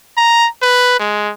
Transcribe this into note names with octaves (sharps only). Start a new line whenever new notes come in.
A#5
B4
G#3